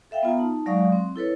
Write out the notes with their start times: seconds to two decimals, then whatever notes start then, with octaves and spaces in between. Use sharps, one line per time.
0.11 A4 E5 F5 G5
0.23 B3 F4 A#5
0.37 D#4 A5
0.66 F#3 G#3 D5 F5 C#6 D#6
0.92 C4
1.16 E4 A4 B4 C#5